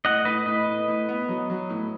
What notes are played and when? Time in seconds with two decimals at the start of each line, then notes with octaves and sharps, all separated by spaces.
0.05 A2 D#5 F#5
0.25 A2 B4 D#5
0.46 A2 B4 D#5
0.67 A2
0.88 A2
1.09 B3
1.29 F#3
1.50 F#3
1.69 A2